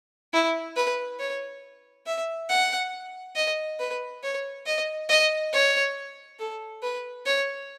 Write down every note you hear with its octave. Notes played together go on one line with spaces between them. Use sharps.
E4
B4
C#5
E5
F#5
D#5
B4
C#5
D#5
D#5
C#5
A4
B4
C#5